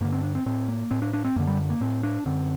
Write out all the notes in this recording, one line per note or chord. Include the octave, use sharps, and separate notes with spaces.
G2 D3 A#3
C4
D4
C4
A2 C4
A#3
A2 C4
D4
D4
C4
F#2 D3 A#3
G3
A#3
A2 C4
D4
F#2 D3 C4